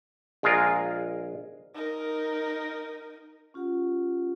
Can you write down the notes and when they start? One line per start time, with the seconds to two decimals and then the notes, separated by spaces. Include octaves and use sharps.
0.43 A#1 G#3 F4 G#4 A#4
1.74 D#4 A#4
3.54 C#4 F4 G4 F#5